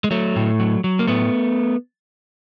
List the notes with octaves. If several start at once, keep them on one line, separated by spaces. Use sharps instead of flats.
G#3
F#3 A3
A2
F#3
F#3
A#3
A2 A3 B3